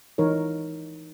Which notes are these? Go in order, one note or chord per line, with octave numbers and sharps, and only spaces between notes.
E3 D#4 A#4 C#5